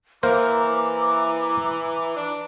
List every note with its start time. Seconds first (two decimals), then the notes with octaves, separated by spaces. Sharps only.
0.23 E3 A#3 A#4 C5 A#5 D6
2.16 D4